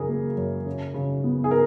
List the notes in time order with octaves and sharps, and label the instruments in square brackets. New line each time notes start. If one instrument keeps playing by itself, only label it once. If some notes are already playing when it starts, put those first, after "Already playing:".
Already playing: [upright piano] F#2 C#3 G#4 A#4
A#3
F#2
C#3
C#3
B3
G#4
A#4